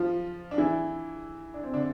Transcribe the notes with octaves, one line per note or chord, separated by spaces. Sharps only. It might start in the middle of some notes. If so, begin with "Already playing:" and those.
Already playing: F3 F4
D4
E3 E4
D4
C4
D3 D4